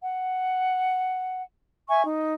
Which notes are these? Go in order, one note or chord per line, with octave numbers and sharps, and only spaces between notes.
F#5
E5 G#5 C#6
D#4